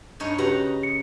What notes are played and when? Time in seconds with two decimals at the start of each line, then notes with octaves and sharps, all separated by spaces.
0.20 G2 D#4 C#5
0.38 C#3 F#4 G4 B4 F#5 A#5
0.83 C#7